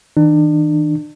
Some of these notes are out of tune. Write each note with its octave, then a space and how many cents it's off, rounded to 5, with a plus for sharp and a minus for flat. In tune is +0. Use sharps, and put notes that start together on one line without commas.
D#3 +40 D4 +35